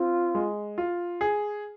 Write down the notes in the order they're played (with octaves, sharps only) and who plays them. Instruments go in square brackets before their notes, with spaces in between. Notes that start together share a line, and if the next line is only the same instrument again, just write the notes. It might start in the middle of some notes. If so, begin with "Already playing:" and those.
Already playing: [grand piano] C4 [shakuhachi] F4
[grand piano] G#3
F4
G#4